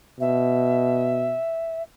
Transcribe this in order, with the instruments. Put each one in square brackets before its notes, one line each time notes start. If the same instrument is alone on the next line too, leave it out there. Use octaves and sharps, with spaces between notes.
[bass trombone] B2 [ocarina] E5